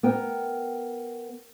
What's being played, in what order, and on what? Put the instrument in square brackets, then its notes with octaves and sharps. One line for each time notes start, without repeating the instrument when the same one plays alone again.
[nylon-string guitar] B3 A#4 G5